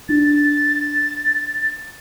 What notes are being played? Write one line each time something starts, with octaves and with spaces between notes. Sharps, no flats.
D4 A6